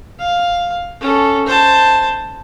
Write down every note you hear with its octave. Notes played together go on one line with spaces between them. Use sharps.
F5
C#4 A4
C5 A5